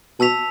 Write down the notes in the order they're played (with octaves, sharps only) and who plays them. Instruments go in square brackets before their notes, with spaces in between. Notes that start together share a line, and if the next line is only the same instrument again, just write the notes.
[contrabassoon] B2 [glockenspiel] A5 E6 B6 F7